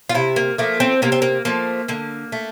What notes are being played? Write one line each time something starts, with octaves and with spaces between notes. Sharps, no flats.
F4
C3 E4
A#3
F3 A3 A#3
C4
C3 A#3
C4
A#3
F3 A3 A#3
D3 A#3
A3